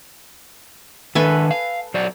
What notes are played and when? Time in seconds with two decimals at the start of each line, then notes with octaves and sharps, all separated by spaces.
1.15 D#3 D4 A4 B4 E5 G#5
1.51 F5
1.94 F#3 C5 D5